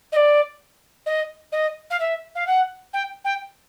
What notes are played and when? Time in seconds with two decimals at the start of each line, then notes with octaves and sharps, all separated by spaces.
0.12 D#5
0.16 D5
1.06 D#5
1.52 D#5
1.90 F5
2.00 E5
2.35 F5
2.47 F#5
2.93 G5
3.24 G5